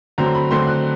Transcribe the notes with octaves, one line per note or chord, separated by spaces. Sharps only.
D3 F#3 A3 C4 A#5
B5
D3 F#3 A3 C4 C6
F#6